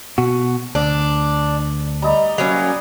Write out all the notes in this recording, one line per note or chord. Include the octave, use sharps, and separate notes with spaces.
B2 F#4
D2 D4
G3 D#5 A#5
F#3 A#3 C#4